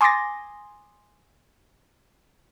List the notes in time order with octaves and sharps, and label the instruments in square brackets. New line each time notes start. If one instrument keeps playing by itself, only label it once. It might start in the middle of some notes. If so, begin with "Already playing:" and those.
[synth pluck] G#5 C6 D6 D#6 A6 A#6